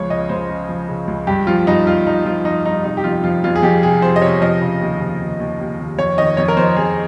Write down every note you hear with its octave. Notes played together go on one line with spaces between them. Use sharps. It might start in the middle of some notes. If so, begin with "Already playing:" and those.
Already playing: C#2 F3 C#5
C#3 D#5
C#2 C5
C#3
F3
C#3
C#2
G2 G4
F3 F4
G2 D#4
G2 F4
F3 D#4
F3 F4
F3 D#4
G2 D#4
C3 D#4
G4
F2 F4
F3 F4
F2 F4
G#4
F2 G4
C3 G#4
F3 C5
D#5
C3 C#5
F3 D#5
C#3
D#2
F3
D#2
D#2
D#2
D#2
F2 C#5
D#3 D#5
F2 C#5
A#4
F2 C5
F2 G#4